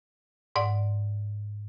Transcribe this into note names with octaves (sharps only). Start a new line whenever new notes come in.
G#2 D5 F#5